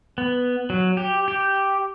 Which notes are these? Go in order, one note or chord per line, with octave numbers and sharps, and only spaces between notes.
B3
F#3
G4
G4